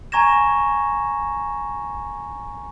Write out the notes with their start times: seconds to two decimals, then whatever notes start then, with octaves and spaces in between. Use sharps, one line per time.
0.12 G#5 A#5 C#6 G#6 A#6 E7